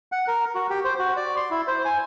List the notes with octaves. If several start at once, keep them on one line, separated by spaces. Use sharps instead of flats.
F#5
A#4
F#4
G4
C5
F#4
D5
C6
E4
C5
G#5